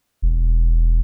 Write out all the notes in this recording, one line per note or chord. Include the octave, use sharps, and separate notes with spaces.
E1